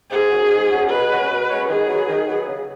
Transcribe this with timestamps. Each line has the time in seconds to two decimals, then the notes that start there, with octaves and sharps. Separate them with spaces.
0.11 G#2 G#4
0.30 D#3 F#3 C#4 F#4
0.50 G#2
0.70 D#3 F#3 C#4 F#4
0.89 B2 B4
1.10 G#3 C#4 F#4 C#5
1.29 B2
1.49 G#3 C#4 F#4 C#5
1.68 D#3 G#4
1.88 F#3 B3
2.07 D#3
2.27 F#3 B3
2.47 C#3